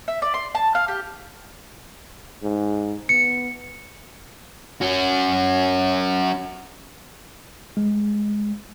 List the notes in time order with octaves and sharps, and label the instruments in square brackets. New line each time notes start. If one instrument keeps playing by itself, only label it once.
[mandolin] E5
D5
C6
A5
F5
G4
[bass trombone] G#2
[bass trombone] B3 [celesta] C#7
[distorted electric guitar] C#4 F#4
[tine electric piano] G#3